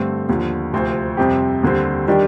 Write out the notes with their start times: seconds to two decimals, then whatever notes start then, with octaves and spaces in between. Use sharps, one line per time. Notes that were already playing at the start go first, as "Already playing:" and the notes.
Already playing: G2 D3 A3 C4 G4
0.29 D#2 D3 F3
0.73 D2 C3 F3 C4 F4
1.17 F2 C3 G3 C4 G4
1.63 D#2 D3 G3 C4
2.08 D#3 G3 D4 G4